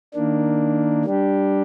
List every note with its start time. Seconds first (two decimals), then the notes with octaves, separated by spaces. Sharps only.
0.14 D#3 A#3 D4
1.05 G3 D4 G4